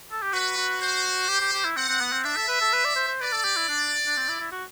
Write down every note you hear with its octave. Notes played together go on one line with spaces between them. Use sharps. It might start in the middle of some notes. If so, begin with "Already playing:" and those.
A4
G4
F#4 B4
F#4
C5
G4
G4
G4
E4
C4 F#5
C4
B3
C4
D4 E5
A4
B4
A4
B4
D5
C5
C5
B4 D5
A4
G4
E4
D4
D4
C4
E4
E4
F#4